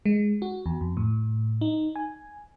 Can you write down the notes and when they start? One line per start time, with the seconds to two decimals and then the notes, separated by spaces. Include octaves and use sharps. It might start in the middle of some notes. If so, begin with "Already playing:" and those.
0.05 G#3
0.42 F#4
0.66 E2
0.81 F2
0.97 A2
1.61 D#4
1.96 G#5